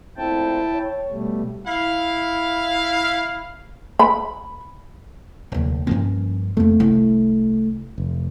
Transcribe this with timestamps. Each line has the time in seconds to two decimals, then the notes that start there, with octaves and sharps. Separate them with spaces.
0.17 A#2 A3 C4 E4 G5 A5
0.73 C#5
1.10 B2 G3 A3
1.66 E4 F5
3.99 B5
5.52 F1 D#2 D3
5.87 G2 F3 A#3 C#4
6.57 F2 A3 A#3
6.80 C2 E4
7.98 F1